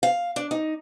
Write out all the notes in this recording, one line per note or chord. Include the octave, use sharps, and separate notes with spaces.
F5
D4
D#4